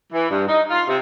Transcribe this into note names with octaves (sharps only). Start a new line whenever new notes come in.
E3
G2
D#4
F4
C3